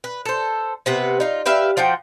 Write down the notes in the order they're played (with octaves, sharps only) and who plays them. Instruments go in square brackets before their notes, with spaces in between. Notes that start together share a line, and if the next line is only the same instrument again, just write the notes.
[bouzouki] B4
A4 C5
C3 B3 B4
D#4 F4
G4 B4 E5 F5
F3 F4 F#4 G5